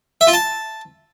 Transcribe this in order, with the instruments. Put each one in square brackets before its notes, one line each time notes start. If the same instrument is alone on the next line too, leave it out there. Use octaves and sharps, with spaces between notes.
[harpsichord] E5
F4
A5